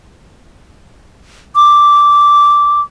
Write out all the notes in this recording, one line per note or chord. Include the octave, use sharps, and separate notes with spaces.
D6